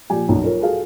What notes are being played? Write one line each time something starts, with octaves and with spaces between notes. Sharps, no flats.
A#2 F3 G4 G#5
B1 F#2
F4 A#4 C#5
F#4 G#4 A4 F5